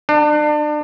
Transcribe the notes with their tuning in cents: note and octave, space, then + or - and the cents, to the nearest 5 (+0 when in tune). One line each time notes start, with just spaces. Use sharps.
D4 +30